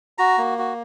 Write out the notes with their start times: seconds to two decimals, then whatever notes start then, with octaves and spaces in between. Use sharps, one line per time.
0.18 F#4 A#5
0.38 A#3
0.58 F#4